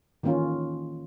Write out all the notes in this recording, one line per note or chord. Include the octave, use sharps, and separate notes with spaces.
D#3 E3 A#3 C#4 F4